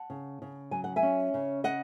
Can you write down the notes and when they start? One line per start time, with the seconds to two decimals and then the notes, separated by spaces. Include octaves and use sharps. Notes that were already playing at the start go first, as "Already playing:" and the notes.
Already playing: F#5 A5
0.10 C#3
0.42 C#3
0.71 F#3 G#5
0.84 F#5
0.96 E5 G#5
1.03 C#4
1.34 C#3
1.64 D#5 F#5